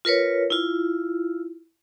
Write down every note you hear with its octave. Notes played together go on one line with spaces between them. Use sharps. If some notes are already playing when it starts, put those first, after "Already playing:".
F4 A#4 B4 C#5
E4 F4